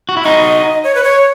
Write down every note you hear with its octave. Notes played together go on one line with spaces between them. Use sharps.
F#4
E4
D#4 F#4 D#5
C#5
B4
C#5